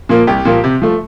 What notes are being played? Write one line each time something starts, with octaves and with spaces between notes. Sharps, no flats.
A#2 F3 A#3
C2 G4
A#2 F3 A#3
C3
F3 A3